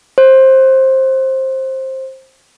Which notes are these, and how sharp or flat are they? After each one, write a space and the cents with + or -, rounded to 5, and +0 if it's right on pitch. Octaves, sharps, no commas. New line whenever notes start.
C5 +15